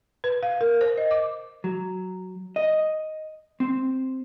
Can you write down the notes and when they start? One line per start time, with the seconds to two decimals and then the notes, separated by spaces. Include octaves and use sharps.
0.24 B4
0.43 F5
0.61 A#4
0.81 C5
0.98 D#5
1.11 D6
1.64 F#3
2.56 D#5
3.60 C4